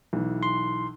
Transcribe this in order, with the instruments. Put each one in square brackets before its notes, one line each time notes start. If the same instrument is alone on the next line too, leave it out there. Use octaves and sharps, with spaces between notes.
[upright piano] B1 E3
[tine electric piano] C6